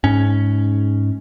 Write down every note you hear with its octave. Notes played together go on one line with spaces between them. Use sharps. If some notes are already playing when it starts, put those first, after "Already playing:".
G#2 C#4